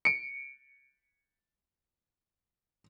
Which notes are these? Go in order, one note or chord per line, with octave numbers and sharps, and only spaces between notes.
C#7 D7